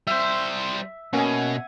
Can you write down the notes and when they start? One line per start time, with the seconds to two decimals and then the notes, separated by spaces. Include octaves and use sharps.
0.07 G3 C5 E5
1.13 B2 A#3 C#4 F#5 G#5